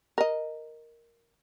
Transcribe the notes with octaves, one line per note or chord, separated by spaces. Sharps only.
A#4 D#5